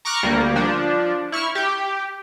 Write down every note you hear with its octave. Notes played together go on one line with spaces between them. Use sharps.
A#5 C#6 D6 F6 F#6 A#6
D2 G3 A#3
F3 D4
E4 C#6 F6
G4